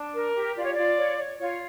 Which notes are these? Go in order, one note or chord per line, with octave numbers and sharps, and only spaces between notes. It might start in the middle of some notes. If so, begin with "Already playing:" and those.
Already playing: D4
A#4
G4
F4 D5
C#5
F4 D5
C#5
C#5
F4 C#5